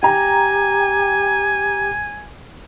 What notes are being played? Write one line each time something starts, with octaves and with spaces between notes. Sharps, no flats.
G4 G5 G#5 A#5